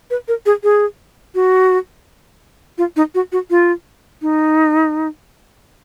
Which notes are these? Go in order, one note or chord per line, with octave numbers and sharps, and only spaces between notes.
B4
A#4
G#4
G#4
F#4
F4
D#4
F#4
F#4
F4
D#4